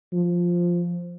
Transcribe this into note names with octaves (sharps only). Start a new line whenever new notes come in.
F3